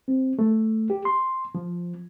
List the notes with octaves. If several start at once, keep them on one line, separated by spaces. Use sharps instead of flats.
C4
A3
G4
C6
F3